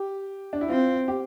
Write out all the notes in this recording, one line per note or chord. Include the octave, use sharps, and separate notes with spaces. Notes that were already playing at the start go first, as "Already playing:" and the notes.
Already playing: G4
D4
E4
C4 F4
G4